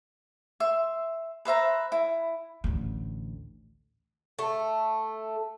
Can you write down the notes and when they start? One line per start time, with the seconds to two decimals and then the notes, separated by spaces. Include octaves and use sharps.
0.60 E5 C6
1.45 B4 C5 E5 A#5
1.92 E4
2.64 A1 D2
4.39 A3